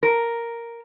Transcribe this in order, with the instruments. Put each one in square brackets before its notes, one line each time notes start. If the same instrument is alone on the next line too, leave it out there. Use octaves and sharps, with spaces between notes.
[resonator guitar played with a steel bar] A#4